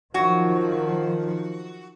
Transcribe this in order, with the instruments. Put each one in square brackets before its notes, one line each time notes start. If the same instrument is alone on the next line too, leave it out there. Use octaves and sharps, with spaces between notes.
[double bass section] D#3 F3 [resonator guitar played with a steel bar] F#3 F#4